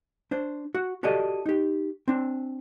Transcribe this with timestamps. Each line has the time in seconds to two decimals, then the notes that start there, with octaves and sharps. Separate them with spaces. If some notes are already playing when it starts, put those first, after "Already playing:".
0.31 D4 C5
0.75 F#4
1.03 F#4 G4 A4 D5 D#5
1.46 D#4 G4
2.08 C4 D4